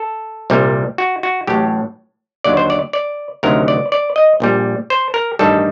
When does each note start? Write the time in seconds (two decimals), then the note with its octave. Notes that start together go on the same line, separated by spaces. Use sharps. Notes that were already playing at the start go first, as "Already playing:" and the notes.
Already playing: A4
0.50 C2 A#2 G3
0.98 F#4
1.23 F#4
1.47 A1 A2 F#3 G4
2.44 D#2 D3 F#3 D5
2.57 C5
2.70 D5
2.93 D5
3.43 D2 C3 D#3 F#3 A#4
3.68 D5
3.92 D5
4.16 D#5
4.40 A#1 A#2 G3
4.90 C5
5.14 A#4
5.39 A1 G2 D#3 G3 A4